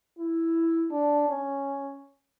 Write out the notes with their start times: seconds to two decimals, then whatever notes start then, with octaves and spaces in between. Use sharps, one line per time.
0.19 E4
0.91 D4
1.29 C#4